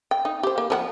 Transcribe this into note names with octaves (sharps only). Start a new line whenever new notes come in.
G5
D#4
G4 C5
A#3
F3 A4 F#5